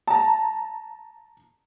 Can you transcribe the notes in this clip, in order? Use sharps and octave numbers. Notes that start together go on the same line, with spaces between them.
A5 A#5